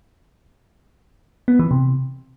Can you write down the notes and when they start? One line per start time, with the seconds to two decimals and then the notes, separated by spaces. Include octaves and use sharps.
1.48 B3
1.59 E3
1.71 C3